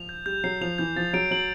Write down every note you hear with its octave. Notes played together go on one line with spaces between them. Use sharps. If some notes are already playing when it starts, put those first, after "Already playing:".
Already playing: F3 F7
G6
G3 G6
F#3 C7
F3 F7
E3 G6
F3 A6
F#3 D7
F#3 F#7